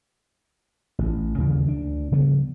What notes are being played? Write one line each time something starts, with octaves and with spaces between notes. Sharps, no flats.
A1
D#2 C#3 E3 G3
D2 D4
C#3 F3 G3 B3